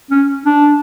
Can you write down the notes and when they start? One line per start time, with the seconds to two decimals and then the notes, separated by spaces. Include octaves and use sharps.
0.11 C#4
0.46 D4